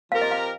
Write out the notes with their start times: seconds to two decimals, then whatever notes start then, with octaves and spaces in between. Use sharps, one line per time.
0.11 F3 C4 G4 A#4 F5
0.21 D#5
0.31 F5